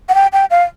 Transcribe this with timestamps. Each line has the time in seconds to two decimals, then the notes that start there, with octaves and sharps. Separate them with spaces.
0.09 F#5
0.15 G5
0.33 G5
0.51 F5